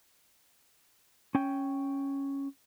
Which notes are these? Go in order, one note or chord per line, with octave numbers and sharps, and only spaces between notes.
C#4 G5